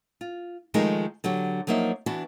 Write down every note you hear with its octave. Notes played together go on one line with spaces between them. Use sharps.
F4
D#3 F3 G#3 A3 D#4 A#4
D3 F#3 F#4 G4
F3 F#3 A#3 D#4 E5
E3 B3 D4 F#4